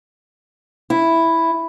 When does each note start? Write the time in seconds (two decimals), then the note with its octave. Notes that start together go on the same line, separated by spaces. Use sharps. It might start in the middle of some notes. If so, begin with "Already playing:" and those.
0.90 E4